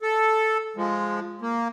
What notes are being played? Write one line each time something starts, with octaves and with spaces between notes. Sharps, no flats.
A4
F3 G#3
A#3